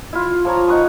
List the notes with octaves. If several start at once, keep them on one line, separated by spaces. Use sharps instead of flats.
E4 F4
F3 C#5 A#5
D#4 F#5 C#6 D#6